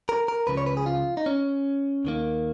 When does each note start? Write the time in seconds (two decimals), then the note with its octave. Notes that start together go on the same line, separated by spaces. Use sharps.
0.09 A#4
0.28 A#4
0.47 C#2 C#3 F3 B4
0.57 C#5
0.66 B4
0.77 G#4
0.86 F4
1.17 D#4
1.26 C#4
2.05 D#2 D#3 A#3